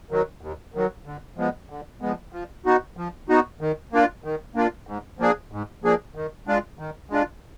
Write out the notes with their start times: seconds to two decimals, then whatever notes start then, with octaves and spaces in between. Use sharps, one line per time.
0.11 D#3 F#3
0.41 D#2
0.74 D#3 F#3
1.06 D3
1.37 F3 G#3 B3
1.70 D3
2.01 F3 G#3 B3
2.32 F3
2.65 B3 D#4 F#4
2.97 F3
3.29 B3 D#4 F#4
3.61 D#3
3.92 A#3 D4 F4
4.24 D#3
4.55 A#3 D4 F4
4.87 G#2
5.19 F3 A#3 D4 G#4
5.52 G#2
5.84 F3 A#3 D4 G#4
6.15 D#3
6.47 G#3 D4 F4
6.79 D#3
7.10 G#3 D4 F4